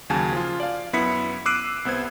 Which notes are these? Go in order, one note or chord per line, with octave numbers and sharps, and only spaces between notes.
D#2 C#3 F#3 G#5 A5 G#6
F3 F4
D5 F5
F#2 B3 E4 B6 C#7
D6 E6 F#6 C7 D7 D#7
C2 B3 C5 G#6